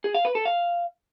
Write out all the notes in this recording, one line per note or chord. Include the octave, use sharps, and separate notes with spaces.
G#4
F5
B4
A4
F5